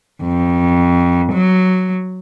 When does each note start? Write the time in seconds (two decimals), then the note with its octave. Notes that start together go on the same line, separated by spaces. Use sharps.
0.22 F2
1.32 F#3